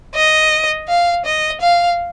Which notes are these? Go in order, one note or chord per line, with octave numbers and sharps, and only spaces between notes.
D#5
F5
D#5
F5